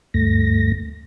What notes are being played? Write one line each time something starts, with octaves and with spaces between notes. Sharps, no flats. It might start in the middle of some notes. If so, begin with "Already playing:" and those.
D2 G2 A3 A#6